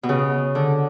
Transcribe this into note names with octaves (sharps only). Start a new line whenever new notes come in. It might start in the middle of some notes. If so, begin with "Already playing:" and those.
B2
C#3
D3